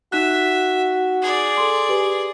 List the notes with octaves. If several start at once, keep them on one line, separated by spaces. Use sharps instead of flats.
D#4 F#4 E5 F#6
G#4 D5
A4 C6
G4 B4 G#5